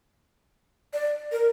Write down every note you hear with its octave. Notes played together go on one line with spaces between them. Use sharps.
D5
A#4